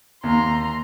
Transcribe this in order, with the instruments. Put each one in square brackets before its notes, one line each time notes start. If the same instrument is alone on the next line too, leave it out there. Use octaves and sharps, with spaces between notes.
[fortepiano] D#2 [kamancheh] A#5 C6